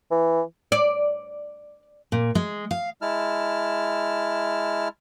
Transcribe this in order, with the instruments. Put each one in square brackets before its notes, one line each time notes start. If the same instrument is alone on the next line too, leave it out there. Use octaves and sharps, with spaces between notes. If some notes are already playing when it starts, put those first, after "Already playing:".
[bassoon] E3
[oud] D5
[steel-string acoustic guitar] A#2
G#3
F5
[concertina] G#3 E4 A5 F6